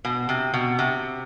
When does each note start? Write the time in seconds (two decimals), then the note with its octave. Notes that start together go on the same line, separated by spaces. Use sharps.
0.05 B2
0.29 C3
0.54 B2
0.79 C3